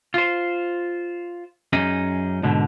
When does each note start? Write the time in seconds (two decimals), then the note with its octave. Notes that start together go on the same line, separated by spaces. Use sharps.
0.14 F4 C5
1.73 F#2 C#4 D#4 G#4
2.43 G#2 B2 D3